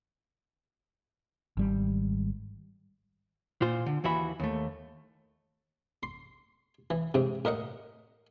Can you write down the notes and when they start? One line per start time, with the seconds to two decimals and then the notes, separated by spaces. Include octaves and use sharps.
1.57 G#1 G3
3.62 A#2 F4 C5
3.86 D3
4.04 D#2 E3 F#4 E5 B5
4.40 D#2 A3
6.03 C6
6.90 E3
7.14 G#2 C3
7.45 A2 A#4 D#5 F#5